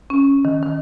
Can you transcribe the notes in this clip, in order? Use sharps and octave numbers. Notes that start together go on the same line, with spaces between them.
C#4
D#3
D#3